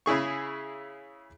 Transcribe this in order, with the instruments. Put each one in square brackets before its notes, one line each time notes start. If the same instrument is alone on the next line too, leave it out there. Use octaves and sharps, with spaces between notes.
[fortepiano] C#3 E4 G#4 C#6